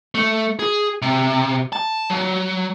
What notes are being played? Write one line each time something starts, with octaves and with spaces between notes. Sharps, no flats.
A3
G#4
C3
A5
F#3